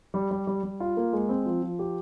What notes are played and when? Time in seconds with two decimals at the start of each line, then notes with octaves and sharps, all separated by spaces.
0.14 G3
0.31 G3
0.47 G3
0.63 G3
0.80 F4
0.97 A#3
1.13 G#3
1.29 C4
1.46 F3
1.63 F3
1.79 G4